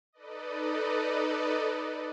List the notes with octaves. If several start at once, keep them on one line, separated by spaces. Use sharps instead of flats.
D#4 A4 B4 D5 D#5